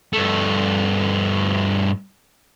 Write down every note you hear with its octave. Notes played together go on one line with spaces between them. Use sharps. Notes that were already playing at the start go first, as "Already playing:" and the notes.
G2 A3